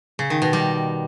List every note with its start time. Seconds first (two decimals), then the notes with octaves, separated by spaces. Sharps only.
0.19 C#3
0.30 D#3
0.42 B2
0.53 G3